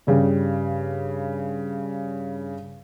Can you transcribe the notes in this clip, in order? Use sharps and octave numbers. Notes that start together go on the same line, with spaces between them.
G2 C#3 G3